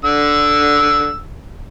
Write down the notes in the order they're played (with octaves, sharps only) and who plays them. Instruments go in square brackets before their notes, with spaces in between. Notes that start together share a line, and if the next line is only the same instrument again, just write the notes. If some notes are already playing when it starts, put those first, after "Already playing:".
[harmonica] D3 E6